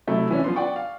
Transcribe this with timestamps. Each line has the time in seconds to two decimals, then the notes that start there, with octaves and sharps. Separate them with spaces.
0.07 C3 F#3 A3 E4
0.30 E3 C#4 D4
0.44 F3 B3 C6
0.56 D5 F#5 G5 C#6
0.76 F5